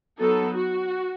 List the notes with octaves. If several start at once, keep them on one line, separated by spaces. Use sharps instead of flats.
F#3 B3 D#4 A4
F#4